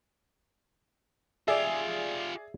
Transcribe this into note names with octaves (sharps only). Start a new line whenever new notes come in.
F4 G4 G#4 D5 E5